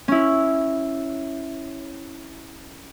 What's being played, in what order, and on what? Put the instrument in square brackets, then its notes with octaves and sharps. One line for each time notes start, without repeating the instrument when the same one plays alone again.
[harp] C#4 E4